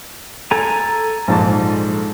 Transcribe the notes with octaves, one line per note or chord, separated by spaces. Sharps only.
A4 G#5 A#5
A#1 G#2 A5